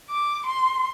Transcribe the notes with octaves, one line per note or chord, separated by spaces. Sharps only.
D6
C6